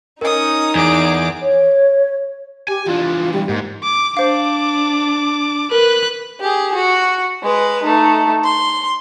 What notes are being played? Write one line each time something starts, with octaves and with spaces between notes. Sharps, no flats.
C#4 D#4 A#4 D#5 D#6
E2 G#4 D6
C#5
G4 G#5
E2 D4 F4
G3
G#2 A#3
D6
D4 C5 F5 D6
A#4 B4 F#6
G4 G#4
F#4
G#3 B4
A3 D#4
C6